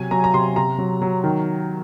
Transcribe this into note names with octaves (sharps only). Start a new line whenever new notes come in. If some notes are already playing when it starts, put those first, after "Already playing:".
Already playing: C3 F#3 G#5
F#3 A#5
A#5
C3 C6
C3 A#5
F#3
F#3
D#3